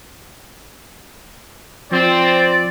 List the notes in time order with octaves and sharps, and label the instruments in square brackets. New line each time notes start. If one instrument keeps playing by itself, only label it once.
[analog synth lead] F3 [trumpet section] C4 [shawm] D5